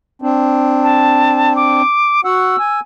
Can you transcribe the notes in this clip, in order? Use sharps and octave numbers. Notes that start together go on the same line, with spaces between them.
C4 D4
A5
D6
F#4 F#5 E6
G#5